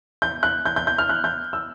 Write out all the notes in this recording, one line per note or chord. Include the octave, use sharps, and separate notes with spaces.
G6
F#6
G6
G6
G6
F6
F#6
G6
E6